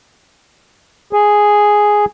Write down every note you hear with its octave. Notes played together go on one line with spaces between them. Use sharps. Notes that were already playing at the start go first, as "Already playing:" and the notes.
G#4